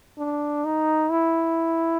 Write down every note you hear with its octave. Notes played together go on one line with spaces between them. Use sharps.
D4
D#4
E4